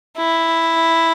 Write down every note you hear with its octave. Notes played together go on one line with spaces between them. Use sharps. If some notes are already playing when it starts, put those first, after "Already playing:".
E4